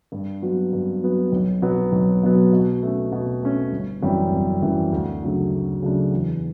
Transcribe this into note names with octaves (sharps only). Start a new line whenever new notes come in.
G2
F#3 B3 F#4
G2
F#3 B3 F#4
B1
B2 F#3 B3
B1
B2 F#3 B3
B2
A3 C#4
B2
A3 C#4
G1
F#2 E3 G3 C#4
G1
F#2 E3 G3 C#4
D2
C#3 F#3 A3 D4
D2
C#3 F#3 A3 D4
E2